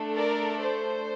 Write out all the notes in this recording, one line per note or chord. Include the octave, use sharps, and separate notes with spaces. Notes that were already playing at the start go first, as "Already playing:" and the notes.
Already playing: A3 D4 A4
A#4 D5
C5